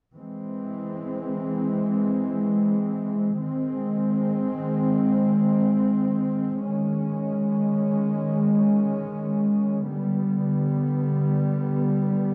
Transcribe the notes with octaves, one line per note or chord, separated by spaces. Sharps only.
E3 G#3 C4
D#3 G#3 C4
D#3 G#3 C#4
D3 G3 B3